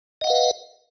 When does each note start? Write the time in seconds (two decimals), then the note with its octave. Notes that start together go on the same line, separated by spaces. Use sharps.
0.21 D#5
0.24 F#5
0.27 F5
0.30 B4